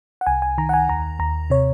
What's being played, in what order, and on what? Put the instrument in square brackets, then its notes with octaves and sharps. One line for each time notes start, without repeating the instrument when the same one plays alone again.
[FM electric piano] F#5
C2 G#5
G#5
D#3 A#5
F#5
G#5
D#2 A#5
D#2 A#5
C3 C#5